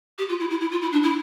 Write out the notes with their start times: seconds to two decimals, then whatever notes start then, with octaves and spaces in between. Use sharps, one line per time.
0.18 G4
0.29 F4
0.40 E4
0.50 E4
0.60 E4
0.71 F4
0.81 E4
0.92 D4
1.03 E4